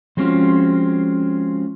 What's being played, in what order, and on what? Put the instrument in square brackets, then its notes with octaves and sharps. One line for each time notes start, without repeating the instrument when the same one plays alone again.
[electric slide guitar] F3 G#3 C4 C#4 F4 F#4